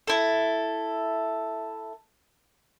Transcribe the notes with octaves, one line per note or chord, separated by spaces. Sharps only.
E4 A4